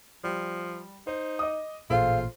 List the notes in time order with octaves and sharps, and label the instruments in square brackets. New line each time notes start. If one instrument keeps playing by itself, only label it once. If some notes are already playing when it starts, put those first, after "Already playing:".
[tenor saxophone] F3 [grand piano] G3 G4
[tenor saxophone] D#4 [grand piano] C5
[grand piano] D#5 D6 D#6
[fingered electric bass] A1 A#2 [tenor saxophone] F4 [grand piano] G#4 A4 C5 [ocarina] F5